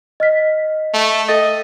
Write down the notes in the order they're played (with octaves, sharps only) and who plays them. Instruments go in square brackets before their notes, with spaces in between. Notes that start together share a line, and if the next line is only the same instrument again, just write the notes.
[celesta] D#5 F6 B6
[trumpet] A3
[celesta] A4 G5 A6 [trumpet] D#5